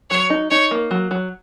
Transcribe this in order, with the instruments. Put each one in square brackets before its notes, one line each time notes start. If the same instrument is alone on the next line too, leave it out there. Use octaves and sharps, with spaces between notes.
[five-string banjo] F#3 [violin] C#5
[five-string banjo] D#4
[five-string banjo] D#4 [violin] C#5
[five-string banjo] A#3
F#3
F#3